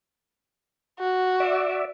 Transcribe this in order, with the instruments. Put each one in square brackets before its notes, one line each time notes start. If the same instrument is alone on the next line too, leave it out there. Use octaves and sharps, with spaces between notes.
[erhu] F#4
[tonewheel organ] D5 E5